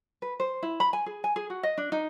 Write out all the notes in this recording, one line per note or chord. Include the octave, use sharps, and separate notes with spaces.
B4
C5
E4
B5
G#5
G#4
G#5
G#4
F#4
D#5
D4
D#4